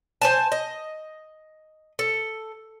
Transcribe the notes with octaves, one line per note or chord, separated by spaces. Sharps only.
C5 G#5 A5
D#5
A4